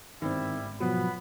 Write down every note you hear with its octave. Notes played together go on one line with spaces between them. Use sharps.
G1 G#2 D#3 G3 C4 E4
B2 F3 F#3 B3 B5